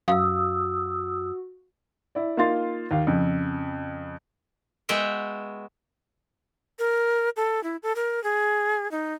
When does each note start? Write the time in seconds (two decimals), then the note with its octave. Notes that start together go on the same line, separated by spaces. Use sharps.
0.08 F#2 F#4 F5 D#6 E6
2.15 E4 D5
2.37 A#3 D#4 F4 F5 C6 A6
2.91 D#2 F5
3.07 F2 C#3
4.89 G#3 B3 F#4 E5 G5
6.79 A#4
7.37 A4
7.64 E4
7.83 A4
7.96 A#4
8.24 G#4
8.91 D#4